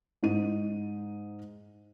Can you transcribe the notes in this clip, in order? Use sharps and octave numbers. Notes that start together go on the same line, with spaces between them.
G#2 D#4 D#7